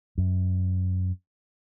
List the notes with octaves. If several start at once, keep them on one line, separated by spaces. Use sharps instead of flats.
F#2